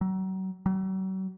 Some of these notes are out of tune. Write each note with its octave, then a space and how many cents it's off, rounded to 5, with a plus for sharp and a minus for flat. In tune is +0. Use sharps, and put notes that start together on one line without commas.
F#3 +35
F#3 +40